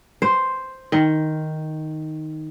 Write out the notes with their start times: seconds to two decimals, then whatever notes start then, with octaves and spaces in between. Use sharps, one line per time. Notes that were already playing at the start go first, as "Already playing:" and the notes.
0.22 C5
0.92 D#3